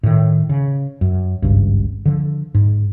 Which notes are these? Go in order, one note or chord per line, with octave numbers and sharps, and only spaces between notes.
A2 D#3
C#3
F#2
G#1 C#2 G2
D3 F3
G#2